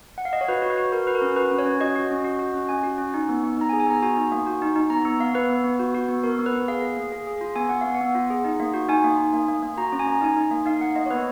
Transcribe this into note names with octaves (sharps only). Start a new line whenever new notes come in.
F#5
F5
D#5
C#5
F#4 B4
F#4
B4
F#4
F#4 A#4
F#4 B4
A#4
C#4
F#4 B4
C#4
C#5
C#4
F#4 D#5
F#4
C#4
F#4
F#4
C#4
C#4 G#5
F#4
C#4
D#4
B3
B3
D#4 A#5
G#5
G#4
G#5
B3 A#5
F#4 G#5
D#4
A#3
F#4
D#4
D#4
B3 A#5
B3
B3 F5
B3 B4
B3
B3
F#4
F#4
B3
B3 A#4
B3
B4
B3
G#4 F5
G#4
A#3
G#4
G#4
F4
B3 G#5
B3 F#5
B3 F5
F#5
B3
F4
G#4
D#4
A#3
F#4
D#4 G#5
A#3
D#4
A#3
A#3
A#3
F#4 A#5
C#4
G#5
A#3 A#5
D#4 G#5
D#4
A#3
D#4 F5
A#3 F#5
A#3 D#5
C#5
B3 B4